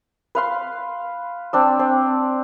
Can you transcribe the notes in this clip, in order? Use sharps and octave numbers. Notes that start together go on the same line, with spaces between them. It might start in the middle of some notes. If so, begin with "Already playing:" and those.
B4 F5 C6
C4 D4 E6
C4